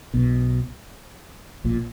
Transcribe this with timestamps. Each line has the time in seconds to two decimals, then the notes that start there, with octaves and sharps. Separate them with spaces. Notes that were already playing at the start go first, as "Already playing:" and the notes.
0.14 B1 B2
1.64 A#1 A#2